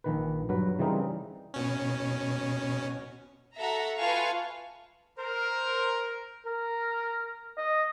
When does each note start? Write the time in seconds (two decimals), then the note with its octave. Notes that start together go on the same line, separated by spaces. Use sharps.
0.04 A#1 D#3 B4
0.49 G2 F#3 B4
0.79 C#3 E3 G3 C4 D#4 A#4
1.54 B2 C#4
3.58 F#4 A4 E5 F#5 A#5
4.00 F4 B4 F5 G#5 A5 C#6
5.18 A#4 C5
6.46 A#4
7.57 D#5